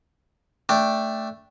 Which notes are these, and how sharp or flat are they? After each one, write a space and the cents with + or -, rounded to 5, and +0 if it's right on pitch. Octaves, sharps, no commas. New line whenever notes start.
A3 +0 D4 +0 G5 +0